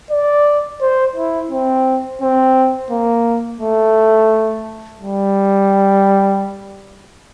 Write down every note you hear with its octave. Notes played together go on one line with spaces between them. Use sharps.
D5
C5
E4
C4
C4
A#3
A3
G3